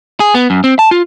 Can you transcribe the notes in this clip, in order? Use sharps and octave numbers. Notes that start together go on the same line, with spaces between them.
G#4
B3
F#2
C4
A5
F4